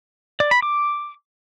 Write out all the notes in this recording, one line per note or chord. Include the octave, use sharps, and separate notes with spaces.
D5
B5
D6